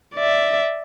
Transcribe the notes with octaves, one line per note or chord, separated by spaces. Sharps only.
D5 E5